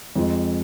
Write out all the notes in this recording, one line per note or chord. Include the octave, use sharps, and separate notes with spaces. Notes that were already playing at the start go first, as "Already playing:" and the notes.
F2 F3 G#3